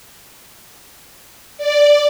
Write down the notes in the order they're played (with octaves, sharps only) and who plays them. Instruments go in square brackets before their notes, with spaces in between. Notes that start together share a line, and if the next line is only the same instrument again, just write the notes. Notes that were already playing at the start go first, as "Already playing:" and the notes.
[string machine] D5